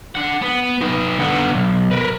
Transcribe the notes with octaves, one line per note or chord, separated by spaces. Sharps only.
D4 F#5
B3
D#4 B4
D3 B3
B1
A#4 B4